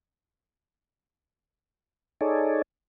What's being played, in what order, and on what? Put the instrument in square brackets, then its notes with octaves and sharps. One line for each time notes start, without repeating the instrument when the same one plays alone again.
[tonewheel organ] D#4 G#4 A4 C#5 D5